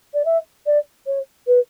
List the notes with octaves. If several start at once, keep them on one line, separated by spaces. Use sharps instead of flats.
D5
E5
D5
C#5
B4